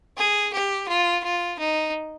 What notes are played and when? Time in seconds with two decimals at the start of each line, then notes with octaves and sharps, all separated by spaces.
0.17 G#4
0.53 G4
0.88 F4
1.24 F4
1.59 D#4